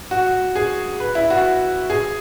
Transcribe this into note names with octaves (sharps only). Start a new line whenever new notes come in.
F#4
G#4
B4
E4
F#4
G#4